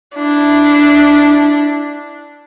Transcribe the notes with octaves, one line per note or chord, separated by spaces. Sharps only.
D4 E4